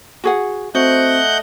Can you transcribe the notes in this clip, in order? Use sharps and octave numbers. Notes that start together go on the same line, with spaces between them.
F#4 G#4 F#5
A3 C4 F#4 D#5 F#5 G6